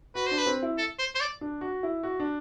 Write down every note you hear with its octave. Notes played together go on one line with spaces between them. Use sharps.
F#4 B4
D4 C5
B4
C4
E4
A4
C5
C5
D5
D4
F#4
E4
F#4
D4